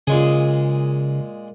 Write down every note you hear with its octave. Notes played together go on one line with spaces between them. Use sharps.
A#2 C#3 G#3 G#4